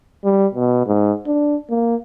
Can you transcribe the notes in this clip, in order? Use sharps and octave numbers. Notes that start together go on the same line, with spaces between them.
G3
B2
G#2
D4
A#3